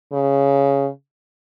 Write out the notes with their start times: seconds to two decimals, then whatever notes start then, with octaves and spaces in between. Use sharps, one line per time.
0.13 C#3